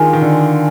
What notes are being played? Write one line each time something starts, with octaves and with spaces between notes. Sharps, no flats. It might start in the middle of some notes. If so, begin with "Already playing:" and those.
Already playing: D#3 G#3 D4 F4 G#4
D#3
D3